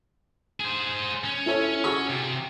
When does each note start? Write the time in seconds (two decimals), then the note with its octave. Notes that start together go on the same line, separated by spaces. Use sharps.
0.60 G#4 C5
1.25 C#4
1.46 E4 A4 C#5
1.84 F#4 G#4 C#6
2.10 C3